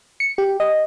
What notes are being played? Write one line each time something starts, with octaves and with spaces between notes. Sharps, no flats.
C#7
G4
D#5